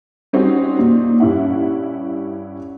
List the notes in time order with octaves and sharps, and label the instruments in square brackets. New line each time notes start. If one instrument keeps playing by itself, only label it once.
[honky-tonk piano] G3 C4 C#4 D#4 F#4
A#2 D#4
G2 C#4 E4 E5 F#5